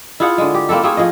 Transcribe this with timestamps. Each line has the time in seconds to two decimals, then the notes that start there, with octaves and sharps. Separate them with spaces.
0.20 E4 F4 G#4 F#5
0.38 D3 G#3
0.54 G4
0.69 A#3 C4 E4 A4
0.83 A3 A#3 C4 G#4
0.97 F3 G#4 D#5